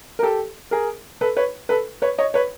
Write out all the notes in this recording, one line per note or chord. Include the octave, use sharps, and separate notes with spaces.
A#4
G4 A4
G#4 A#4
A4 B4
B4 C#5
A4 B4
B4 C#5
C#5 D#5
B4 C#5